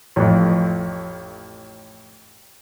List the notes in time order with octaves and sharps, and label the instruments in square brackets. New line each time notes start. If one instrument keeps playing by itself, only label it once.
[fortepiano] A1 F2